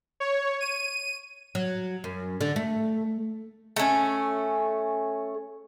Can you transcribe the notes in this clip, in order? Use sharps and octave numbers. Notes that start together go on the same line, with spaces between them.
C#5
D#7
F#3
F#2
D3
A3
A3 C#4